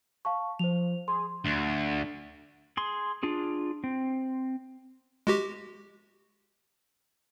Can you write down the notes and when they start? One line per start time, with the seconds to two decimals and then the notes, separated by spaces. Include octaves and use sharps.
0.25 F5 A5 C#6
0.59 F3 C5 F7
1.08 G#4 C6
1.45 D2
2.77 G#4 C6
3.23 D4 F4 G#4
3.84 C4
5.27 G#3 F#4 G4